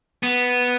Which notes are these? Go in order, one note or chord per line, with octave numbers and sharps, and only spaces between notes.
B3